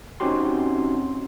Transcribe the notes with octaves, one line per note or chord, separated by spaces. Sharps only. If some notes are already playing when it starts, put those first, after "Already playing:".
C4 C#4 D#4 F#4 G4 C6